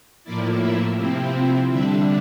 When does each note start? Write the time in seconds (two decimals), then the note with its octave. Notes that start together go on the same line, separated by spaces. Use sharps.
0.24 A2 F3 A#3 E4 D5
0.61 E5
0.97 C3 F3 C4 E4
1.70 D3 G3 D4 E5